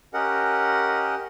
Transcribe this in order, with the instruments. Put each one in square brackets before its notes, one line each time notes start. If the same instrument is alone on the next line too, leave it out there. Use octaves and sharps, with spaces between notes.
[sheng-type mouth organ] C#4 G4 A#4 D#5 F#5